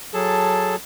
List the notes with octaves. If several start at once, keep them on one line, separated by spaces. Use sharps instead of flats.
F#3 G#4 A4 A5